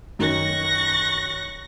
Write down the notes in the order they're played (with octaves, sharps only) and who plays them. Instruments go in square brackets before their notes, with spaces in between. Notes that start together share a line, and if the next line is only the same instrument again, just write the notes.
[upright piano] F#2 D#3 [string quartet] C#6 F#6 A#6